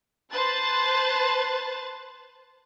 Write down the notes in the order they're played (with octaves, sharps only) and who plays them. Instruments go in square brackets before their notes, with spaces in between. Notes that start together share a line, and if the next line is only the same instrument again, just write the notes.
[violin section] B4 C5 A5 F#6 A6